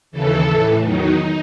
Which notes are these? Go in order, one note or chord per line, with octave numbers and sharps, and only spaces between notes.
D#2 C#3 E3 A4
A2 E3
E2 D#3 F#3 D#4